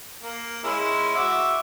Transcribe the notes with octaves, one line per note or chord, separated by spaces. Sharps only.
A#3
G#3 C#4 E4
F#4 E5 D6